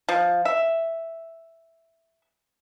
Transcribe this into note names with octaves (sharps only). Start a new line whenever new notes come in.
F3
E5